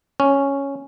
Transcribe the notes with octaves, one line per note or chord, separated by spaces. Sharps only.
C#4